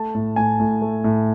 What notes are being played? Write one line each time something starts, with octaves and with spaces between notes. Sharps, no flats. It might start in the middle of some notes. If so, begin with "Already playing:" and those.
Already playing: A3 A5
A2
A2 G#5
A2
A3
A2